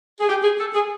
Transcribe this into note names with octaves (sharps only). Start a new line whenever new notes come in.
G#4
G4
G#4
A4
G#4